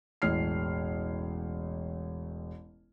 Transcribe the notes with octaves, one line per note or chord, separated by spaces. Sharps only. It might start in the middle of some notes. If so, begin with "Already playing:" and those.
E1 A1 C#5 F6 C7